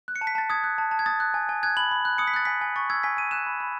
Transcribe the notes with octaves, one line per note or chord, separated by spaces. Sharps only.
F#6
C#7
A5
B6
A5 A6
D#6 G#6
F#6
A5
A5
G#6
D#6 A6
F#6
G#5
G#5
F#6 G#6
B5 F#7
B5
F#6
D#6 C#7
B6
F#6 A6
G#5 B6
G#5
C#6 A6
E6 G#6
G#5 B6
G#5 D#7
F#6 E7
B5
B5